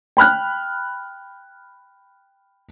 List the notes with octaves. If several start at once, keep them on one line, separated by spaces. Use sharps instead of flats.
G5 B5 F6 F#6